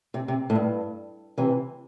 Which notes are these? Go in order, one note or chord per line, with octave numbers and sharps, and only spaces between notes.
C3
C3
A2
G2
C3 E3